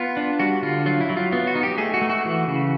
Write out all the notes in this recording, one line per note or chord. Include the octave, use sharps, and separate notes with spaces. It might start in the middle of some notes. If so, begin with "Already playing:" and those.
Already playing: B3 F4
D4
G3 F#4
D3 F4
F#3 F4
E4
F#3
F4
B3 F4
F#4
D#4
G4
A3 G#4
F#4
A3
F#4
E3
C#3